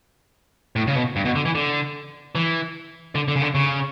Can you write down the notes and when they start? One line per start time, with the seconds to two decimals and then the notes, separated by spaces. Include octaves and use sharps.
0.76 A2
0.87 C#3
0.96 B2
1.16 G2
1.25 B2
1.36 D3
1.45 E3
1.55 D3
2.35 E3
3.15 D3
3.28 D3
3.36 C#3
3.42 D3
3.55 C#3